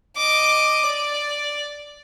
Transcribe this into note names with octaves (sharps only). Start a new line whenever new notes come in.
D#5 D6
D5